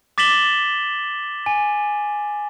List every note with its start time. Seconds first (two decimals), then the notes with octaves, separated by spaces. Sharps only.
0.18 D6 A6 B6 E7 F#7 G7
1.46 G#5